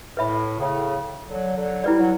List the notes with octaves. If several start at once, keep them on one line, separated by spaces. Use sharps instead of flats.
A2 B4 E5 B5
A2 C#3
D3 F#3
D3 F#3
G3 E4 B4 D5
F#3